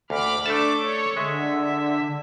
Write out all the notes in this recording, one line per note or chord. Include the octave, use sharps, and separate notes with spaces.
D2 B5 D6 F6
A3 D4 A4 E5 A5 D6
C#5
D3 G#3 E5